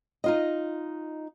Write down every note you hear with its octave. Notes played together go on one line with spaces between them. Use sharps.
D#4 F4 D#5